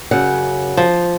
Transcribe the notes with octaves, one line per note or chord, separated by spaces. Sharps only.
F#2 C#3 F#5
F3